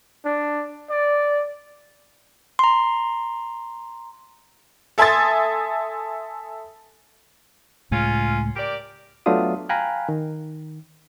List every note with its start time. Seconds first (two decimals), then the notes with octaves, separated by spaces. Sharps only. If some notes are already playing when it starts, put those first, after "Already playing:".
0.25 D4
0.90 D5
2.59 A#5 C6
4.98 A4 E5 G#5 C6 D#6 A6
7.91 C#2 A2 G#3 C#4 F4
8.55 G4 A#4 D5
9.26 F#3 A3 B3 D4 F4 D#6
9.69 F5 G5 G#5 A#5 B5 F#6
10.09 D#3